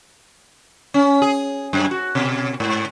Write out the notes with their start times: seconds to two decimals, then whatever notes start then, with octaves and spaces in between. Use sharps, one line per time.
0.94 C#4
1.22 G#4
1.73 F#2
1.91 F#4
2.15 B2
2.60 G#2